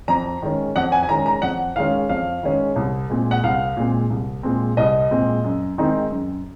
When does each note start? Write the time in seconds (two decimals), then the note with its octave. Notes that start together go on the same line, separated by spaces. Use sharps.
0.08 F2 A#5
0.42 D#3 G#3 C#4
0.76 F2 F#5
0.92 G#5
1.03 G#5
1.09 D#3 G#3 C#4 A#5
1.26 A#5
1.42 F2 F#5
1.76 D#3 G#3 C#4 F5
2.09 F2 F5
2.43 D#3 G#3 C#4
2.76 C2
3.10 A#2 G#3 C4
3.31 F#5
3.43 C2 F5
3.77 A#2 G#3 C4
4.10 C2
4.43 A#2 G#3 C4
4.77 C2 D#5
5.11 A#2 G#3 C4
5.44 F#2
5.78 D#3 G#3 C4 D#4
6.11 F#2